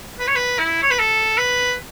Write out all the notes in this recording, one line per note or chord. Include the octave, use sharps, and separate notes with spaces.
B4
C#5
B4
E4
C#5
B4
A4
B4